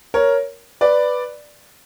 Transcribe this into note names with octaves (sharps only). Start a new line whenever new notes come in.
A#4 C#5
B4 D5